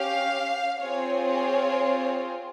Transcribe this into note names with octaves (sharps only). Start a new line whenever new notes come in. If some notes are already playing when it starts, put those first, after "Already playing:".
Already playing: C#4 G4 F5
C4 F4 G#4 C#5
C#5